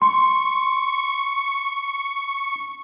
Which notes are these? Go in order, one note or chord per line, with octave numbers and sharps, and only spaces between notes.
C6 C#6